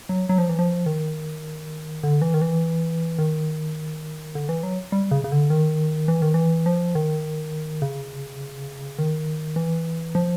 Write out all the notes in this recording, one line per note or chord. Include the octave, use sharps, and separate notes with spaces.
F#3
F#3
F3
E3
F3
D#3
D3
E3
D#3
E3
D#3
D3
E3
F#3
G3
C#3
C#3
D3
D#3
E3
D#3
E3
F3
D#3
C#3
D#3
E3
F3